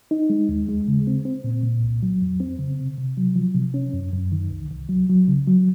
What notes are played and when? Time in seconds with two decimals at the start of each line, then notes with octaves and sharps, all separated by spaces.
0.11 D#4
0.30 G#3
0.49 D#2
0.69 G#3
0.88 C#3
1.07 C4
1.25 C4
1.44 A#2
1.63 A#2
1.83 C2
2.03 F#3
2.22 F2
2.40 C4
2.59 C#3
2.79 C3
2.98 C3
3.17 F#3
3.36 F3
3.55 C3
3.74 C#4
3.93 F#2
4.13 F#2
4.32 D#3
4.51 C2
4.71 C2
4.89 F#3
5.09 F#3
5.28 C#3
5.47 F#3